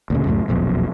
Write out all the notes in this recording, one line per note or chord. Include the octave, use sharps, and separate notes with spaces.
D2 A#2 C#3
C#2 F#2 A2 A3
E1 B1 F2 A#2